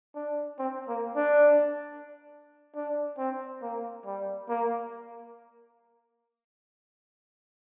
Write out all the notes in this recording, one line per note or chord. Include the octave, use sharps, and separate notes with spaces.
D4
C4
A#3
D4
D4
C4
A#3
G3
A#3